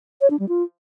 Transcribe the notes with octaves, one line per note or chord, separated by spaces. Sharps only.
C#5
D4
G3
F4